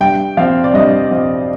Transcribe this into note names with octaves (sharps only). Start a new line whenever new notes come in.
G2 G5
F3 C4 F5
D5
G2 D#5
F3 C4